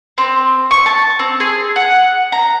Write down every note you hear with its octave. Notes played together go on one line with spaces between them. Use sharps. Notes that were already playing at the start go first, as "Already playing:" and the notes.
C4
C#6
A5
C4
G#4
F#5
A#5